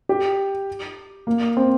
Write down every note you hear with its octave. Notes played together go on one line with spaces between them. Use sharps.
G4
A#3
C4